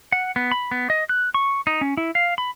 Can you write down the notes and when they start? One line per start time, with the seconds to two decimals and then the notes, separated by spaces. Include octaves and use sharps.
0.12 F#5
0.36 B3
0.52 B5
0.71 B3
0.90 D#5
1.09 F#6
1.34 C#6
1.67 D#4
1.81 C#4
1.97 E4
2.15 F5
2.38 B5